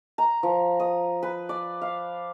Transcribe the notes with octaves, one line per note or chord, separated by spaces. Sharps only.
A#5
F3
D#6
B4
D5
F5